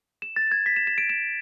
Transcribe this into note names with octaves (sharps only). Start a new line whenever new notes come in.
E7
A6
G#6
B6
E7
E7
D7
E7